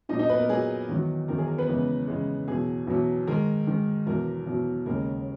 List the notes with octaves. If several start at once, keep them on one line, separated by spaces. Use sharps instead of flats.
A#2 F#3 D#4 D#5
D#4 D#5
B3 B4
A#4
A#2 F#3 G#4
E2 D#3 F#3
E2 D#3 F#3 A#4
G#4
A#4
B3 B4
E2 C#3 G#3
E2 C#3 G#3
E2 B2 F#3 G#4
E2 B2 F#3
G#2 D#3 G#3 A#4
G#2 D#3 G#3
E2 B2 F#3 A#4
E2 B2 F#3
D#2 C#3 G#3 A#4